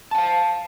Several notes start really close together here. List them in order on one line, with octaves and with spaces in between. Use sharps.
A5 F#5 F5